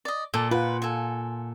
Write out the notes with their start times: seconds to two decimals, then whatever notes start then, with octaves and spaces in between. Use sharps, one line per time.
0.05 D5 D#5
0.34 A#2 A4
0.51 F4 B4 F#5
0.82 A4 G#5